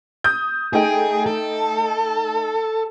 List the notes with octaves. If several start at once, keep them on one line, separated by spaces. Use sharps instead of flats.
D#6 G6
A3 D#4 G#4 G5
A4